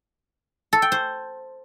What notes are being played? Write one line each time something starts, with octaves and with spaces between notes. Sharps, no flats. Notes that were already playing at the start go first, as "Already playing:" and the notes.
A4
G5
C5